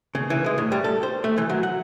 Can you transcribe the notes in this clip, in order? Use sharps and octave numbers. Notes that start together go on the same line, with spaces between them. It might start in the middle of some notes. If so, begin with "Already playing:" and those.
C#3
E3
G#3
A2
G3
A4
C5
A3
E3
F#3
F#5